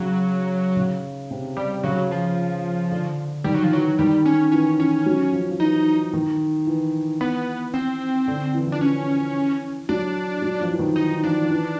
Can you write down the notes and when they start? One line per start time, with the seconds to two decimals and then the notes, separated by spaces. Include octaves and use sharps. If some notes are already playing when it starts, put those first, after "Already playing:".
Already playing: C#3 F#3
0.76 C#3
1.31 C3
1.57 G3
1.83 C#3 F#3
2.11 F3
2.91 D3
3.44 D#3 G3
3.54 F#3
3.63 F3
3.72 E3 F#3
3.99 D#3 G3
4.26 C#4
4.52 E3 C#4
4.79 E3 C#4
5.06 F#3
5.32 F3
5.50 F3
5.60 E3 D#4
6.13 D#3
6.67 E3
7.21 B3
7.74 C4
8.28 D3
8.54 E3
8.66 F3
8.72 D4
8.78 E3 C#4
9.89 F#3 D4
10.42 F#3
10.61 F3
10.72 E3
10.79 D#3
10.96 D#4
11.23 F3 D4
11.42 F3
11.50 E3